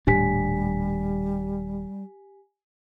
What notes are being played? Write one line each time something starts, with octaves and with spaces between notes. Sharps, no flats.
D#1 A2 G3 D4 G4 G#5 B6